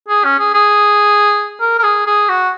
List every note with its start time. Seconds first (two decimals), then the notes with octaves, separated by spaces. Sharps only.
0.09 G#4
0.24 C#4
0.39 G#4
0.54 G#4
1.61 A#4
1.79 A#4
1.83 G#4
2.06 G#4
2.29 F#4